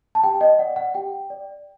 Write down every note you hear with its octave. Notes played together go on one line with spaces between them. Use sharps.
A5
G4 G5
D#5
D5 F#5
F#5
G4 G5
D5